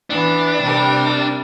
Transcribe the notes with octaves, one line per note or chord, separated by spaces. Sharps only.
E3 B3 D4
C3 G3 A#4